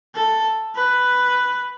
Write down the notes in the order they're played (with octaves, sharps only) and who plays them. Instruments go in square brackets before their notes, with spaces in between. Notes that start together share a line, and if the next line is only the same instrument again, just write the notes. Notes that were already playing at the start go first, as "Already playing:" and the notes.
[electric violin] A4
B4